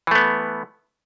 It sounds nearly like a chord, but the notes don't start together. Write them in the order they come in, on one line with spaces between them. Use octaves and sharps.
E3 A3 B3